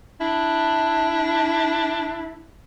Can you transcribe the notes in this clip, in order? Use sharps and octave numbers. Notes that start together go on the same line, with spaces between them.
D4 E4